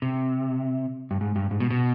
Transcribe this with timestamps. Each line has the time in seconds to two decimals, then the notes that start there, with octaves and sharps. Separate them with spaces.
0.02 C3
1.11 G2
1.21 G#2
1.36 G2
1.51 G#2
1.60 B2
1.70 B2